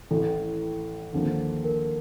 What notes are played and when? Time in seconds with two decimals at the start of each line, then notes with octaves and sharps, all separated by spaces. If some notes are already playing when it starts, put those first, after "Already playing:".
0.11 A1 A2 E3 A4
1.13 D#2 D3 F3 A#3
1.64 A#4